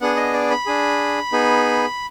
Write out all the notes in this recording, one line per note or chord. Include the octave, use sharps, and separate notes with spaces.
B3 D4 G#4 F#5
D#5
D5
B5
D4 G#4
B3 D#4 G#4